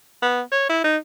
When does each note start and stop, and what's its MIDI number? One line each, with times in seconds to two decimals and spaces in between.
0.22 0.41 59
0.52 0.67 73
0.69 0.84 64
0.84 0.97 63